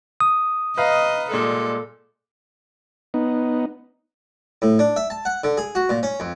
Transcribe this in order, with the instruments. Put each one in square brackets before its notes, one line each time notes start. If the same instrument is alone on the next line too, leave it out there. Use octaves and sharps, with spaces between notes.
[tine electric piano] D#6
[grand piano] B4 F5 A#5 [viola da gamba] D#5
[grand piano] A#2 G3 G#3 [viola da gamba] A4
[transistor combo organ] B3 D#4
[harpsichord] A2
D4
E5
A5
F#5
D3
G#4
F#4
A#2
C#4
F2